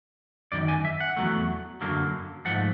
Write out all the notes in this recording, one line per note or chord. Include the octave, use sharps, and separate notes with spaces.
F#2 D#3 D5
G#5
E5
F#5
E2 B2 F#3 A3
F#2 D3 F#3 A#3
G#2 F3 A3 F#5